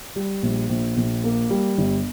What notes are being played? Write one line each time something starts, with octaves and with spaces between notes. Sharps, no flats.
G3
A#1
A#1
A#1
A#3
G3
G1